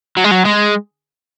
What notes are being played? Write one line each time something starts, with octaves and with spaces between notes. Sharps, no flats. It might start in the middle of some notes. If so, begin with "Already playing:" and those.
F#3
G#3
F#3
G#3